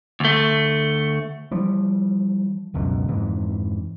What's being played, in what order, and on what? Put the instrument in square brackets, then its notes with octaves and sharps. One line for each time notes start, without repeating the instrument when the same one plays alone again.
[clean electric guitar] D2 A3
[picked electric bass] E3 F3 G3
E1 C#2 F#2 B2
F2 G#2 E3